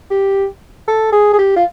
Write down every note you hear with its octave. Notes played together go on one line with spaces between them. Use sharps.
G4
A4
G#4
G#4
G4
F4